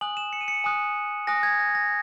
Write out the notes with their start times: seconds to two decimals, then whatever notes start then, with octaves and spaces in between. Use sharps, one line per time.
0.01 G#5 D#6 F#6 F#7
0.17 E7
0.33 C#7
0.41 D#7
0.48 C#7
0.64 G#5 D#6 F#6
1.27 G#5 D#6 F#6 A#6
1.43 G#6
1.59 A#6
1.75 A#6